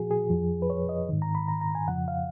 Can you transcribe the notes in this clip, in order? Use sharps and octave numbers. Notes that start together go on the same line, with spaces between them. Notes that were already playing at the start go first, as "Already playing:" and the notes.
Already playing: A#2 F3 F#4 G#4
G#4
F2 F3
B4
C#5
D#5
G#2 D#3
A#5
B5
A#5
A#5
G#5
F2 C#3 F3 F#5
F5